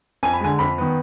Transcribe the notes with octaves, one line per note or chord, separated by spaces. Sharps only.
F2 G#5
B5
D3 G#3 G#5
F2 B5
D#3 B3